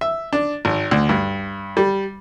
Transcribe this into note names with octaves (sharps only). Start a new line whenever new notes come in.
E5
D4
G#1
D2
G2
G3